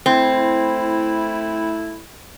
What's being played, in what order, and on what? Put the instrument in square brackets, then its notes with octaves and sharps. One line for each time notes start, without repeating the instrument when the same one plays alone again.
[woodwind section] A3 E4 [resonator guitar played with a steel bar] C4